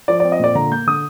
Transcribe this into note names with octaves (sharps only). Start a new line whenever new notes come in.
F3 D5
C4 D5
D#5
A#2 D5
D3 A#5
A#3 G6
D3 D#6